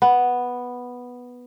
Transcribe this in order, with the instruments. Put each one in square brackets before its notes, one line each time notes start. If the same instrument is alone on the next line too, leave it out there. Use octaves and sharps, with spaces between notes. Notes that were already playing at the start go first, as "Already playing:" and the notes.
[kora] B3